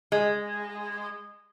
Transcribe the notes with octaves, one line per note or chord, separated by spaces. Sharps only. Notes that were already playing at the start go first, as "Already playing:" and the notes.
G#3